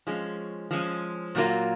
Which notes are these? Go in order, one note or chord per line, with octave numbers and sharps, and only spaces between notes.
F3 G#3 C#4
F3 G#3 C#4
A#2 F#3 A#3 F4